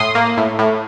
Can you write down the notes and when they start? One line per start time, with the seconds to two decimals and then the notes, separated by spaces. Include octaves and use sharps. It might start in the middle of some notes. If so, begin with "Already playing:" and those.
Already playing: A2 C6 D#6
0.15 A#3
0.37 A2
0.59 A2